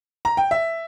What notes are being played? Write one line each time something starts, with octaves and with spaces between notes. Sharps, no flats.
A#5
G5
E5